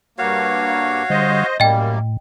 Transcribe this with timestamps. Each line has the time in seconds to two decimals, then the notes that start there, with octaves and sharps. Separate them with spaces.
0.18 G2 A#3 F#4 C#5 F5
1.10 D3 G3 C5 D#5
1.60 F#2 A2 G3 A#3 D#5 G5